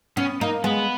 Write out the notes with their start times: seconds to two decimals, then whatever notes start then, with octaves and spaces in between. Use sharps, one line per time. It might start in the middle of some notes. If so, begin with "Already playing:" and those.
0.17 B3 C#4
0.41 A#3 D#4
0.64 G#3 B3